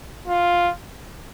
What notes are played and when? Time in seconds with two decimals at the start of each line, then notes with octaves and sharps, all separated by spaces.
0.27 F4